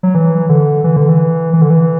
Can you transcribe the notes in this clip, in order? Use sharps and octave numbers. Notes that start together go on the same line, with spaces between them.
F#3
E3
D3
E3
D3
E3
E3
D3
E3